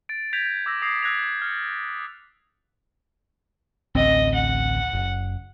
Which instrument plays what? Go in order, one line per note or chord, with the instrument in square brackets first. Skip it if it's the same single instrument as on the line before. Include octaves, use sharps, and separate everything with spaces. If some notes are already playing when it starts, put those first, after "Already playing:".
[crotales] A6 D7
G6 G#6 B6 D7 F7
D6 E6 A#6
D#6 G#6 A#6 C7
E6 F#6 G#6 A#6 F7
F6 A6 C#7
[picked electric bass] A1 D2 C4 [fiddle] D#5
[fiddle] F#5
[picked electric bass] F#1